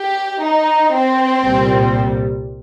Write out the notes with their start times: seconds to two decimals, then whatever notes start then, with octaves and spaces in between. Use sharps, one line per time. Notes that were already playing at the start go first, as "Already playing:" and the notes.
Already playing: G4
0.43 D#4
0.92 C4
1.42 C2 A#2 G3